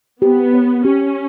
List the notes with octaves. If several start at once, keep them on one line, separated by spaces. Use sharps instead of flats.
B3 G4
C#5
C#4 G4